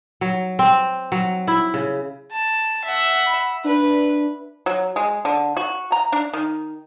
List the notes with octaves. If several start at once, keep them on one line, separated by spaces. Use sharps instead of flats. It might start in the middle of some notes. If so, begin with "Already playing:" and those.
F#3
C4
F#3
E4
C#3
A5
E5 F#5
B5
D4 B4
F#3
G#3
D3
F#4
A#5
D4
D#3